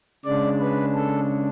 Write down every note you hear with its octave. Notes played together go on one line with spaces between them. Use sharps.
C#3 G#3 D4 D5
B4
A4